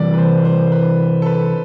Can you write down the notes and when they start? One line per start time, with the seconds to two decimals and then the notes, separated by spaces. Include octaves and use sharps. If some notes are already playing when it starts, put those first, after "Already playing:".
Already playing: C3 E3 G3 D5
0.14 B4
0.18 C5
0.45 C5
0.72 B4
1.22 A4
1.26 B4